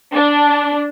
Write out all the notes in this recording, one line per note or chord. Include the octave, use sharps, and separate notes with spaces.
D4